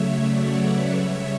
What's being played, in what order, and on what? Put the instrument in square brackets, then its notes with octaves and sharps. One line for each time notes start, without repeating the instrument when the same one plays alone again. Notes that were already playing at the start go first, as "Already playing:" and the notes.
Already playing: [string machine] C#3 F#3 A3 C#5 E5
D5 F#5
B4 D5
C#3 G3 C#5 E5